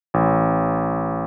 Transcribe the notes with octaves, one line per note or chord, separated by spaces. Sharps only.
A1